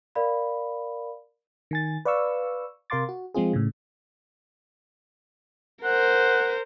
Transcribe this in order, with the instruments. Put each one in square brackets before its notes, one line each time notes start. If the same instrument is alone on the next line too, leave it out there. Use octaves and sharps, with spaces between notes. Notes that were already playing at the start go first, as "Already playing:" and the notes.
[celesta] A#4 D5 F5 B5
[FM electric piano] D#3 G#5 A6
B4 D5 F5 C#6 E6
C3 A#4 F5 C6 D6 A6
F#4
F3 G#3 C4 F4 G#4
A2 C#3
[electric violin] A#4 C5 [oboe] F#5